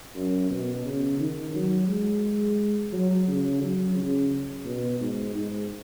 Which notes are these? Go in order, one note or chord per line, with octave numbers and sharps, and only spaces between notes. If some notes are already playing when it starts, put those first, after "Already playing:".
F#2
B2
C#3
D#3
F#3
G#3
F#3
C#3
F#3
C#3
B2
G#2
G#2